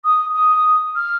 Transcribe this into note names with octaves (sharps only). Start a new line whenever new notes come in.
D#6
D#6
F6